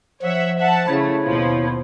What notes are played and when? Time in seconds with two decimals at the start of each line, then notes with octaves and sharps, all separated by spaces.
0.22 F3 C#5 E5 F#5
0.60 E5 F#5 A5
0.88 C#3 A3 E4 C#5
1.26 D#2 B2 F3